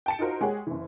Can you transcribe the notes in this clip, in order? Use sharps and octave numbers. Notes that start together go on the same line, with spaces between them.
G5 A5 C#7
D#4 F4 F#4 A#4 C5
G#3 G4 G#4 C#5 F#5
F#1 E3